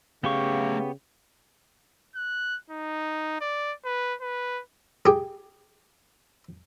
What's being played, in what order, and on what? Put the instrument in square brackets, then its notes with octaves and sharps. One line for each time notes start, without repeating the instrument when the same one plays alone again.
[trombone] C#3 [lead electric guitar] A3 F5 [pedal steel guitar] B3 G4 C#6
[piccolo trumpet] F#6
D#4
D5
B4
B4
[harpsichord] G4 G#4